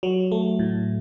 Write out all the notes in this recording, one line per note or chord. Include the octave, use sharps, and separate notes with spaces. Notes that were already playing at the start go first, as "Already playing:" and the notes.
F#3
A3
A2